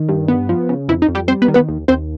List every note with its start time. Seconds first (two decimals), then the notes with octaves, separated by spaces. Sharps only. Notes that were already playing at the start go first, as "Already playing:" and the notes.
Already playing: D#3
0.09 G2
0.28 B3
0.49 F3
0.69 C#3
0.88 F2 E3 E4
1.02 D#4
1.09 F2
1.15 G3 G4
1.28 G3 C4 C5
1.42 B3 B4
1.48 D#3
1.54 B3 B4
1.69 D#2
1.88 D#2 C4 C5